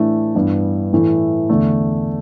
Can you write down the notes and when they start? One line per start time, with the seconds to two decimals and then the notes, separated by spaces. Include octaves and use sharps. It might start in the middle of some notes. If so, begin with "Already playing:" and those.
Already playing: A2 E3 A3 D4
0.35 G2 E3 B3
0.93 A2 E3 A3
1.49 E2 D3 A3